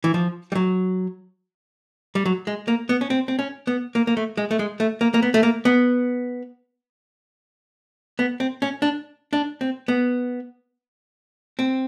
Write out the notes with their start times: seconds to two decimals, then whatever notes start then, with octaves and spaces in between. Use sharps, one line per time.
0.04 E3
0.14 F3
0.52 G3
0.55 F#3
2.15 G3
2.26 F#3
2.47 G#3
2.68 A#3
2.89 B3
3.01 C#4
3.10 C4
3.28 C4
3.39 C#4
3.67 B3
3.95 A#3
4.07 A#3
4.17 A3
4.37 G#3
4.51 A3
4.59 G#3
4.80 A3
5.01 A#3
5.14 A#3
5.23 B3
5.34 A3
5.43 A#3
5.65 B3
8.19 B3
8.40 C4
8.62 C#4
8.82 D4
9.33 D4
9.61 C4
9.88 B3
11.59 C4